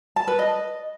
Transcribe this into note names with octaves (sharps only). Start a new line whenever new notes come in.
A5
B4
D#5